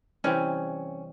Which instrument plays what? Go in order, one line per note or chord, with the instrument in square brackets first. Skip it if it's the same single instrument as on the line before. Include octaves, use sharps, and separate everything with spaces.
[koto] C3 E3 G3 C4 [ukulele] C#4